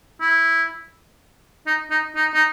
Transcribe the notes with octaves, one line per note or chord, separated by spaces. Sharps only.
E4
D#4
D#4
D#4
D#4